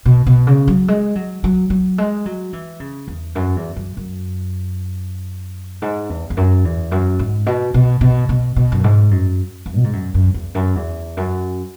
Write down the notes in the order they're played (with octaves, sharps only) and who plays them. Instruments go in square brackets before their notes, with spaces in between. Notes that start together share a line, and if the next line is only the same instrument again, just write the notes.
[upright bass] B2
B2
C#3
F#3
G#3
F#3
F#3
F#3
G#3
F#3
E3
C#3
E2
F#2
E2
F#2
F#2
G#2
E2
E2
F#2
E2
F#2
G#2
B2
B2
B2
B2
B2
F#2
G#2
F#2
E2
B2
G#2
F#2
F#2
E2
F#2
E2
F#2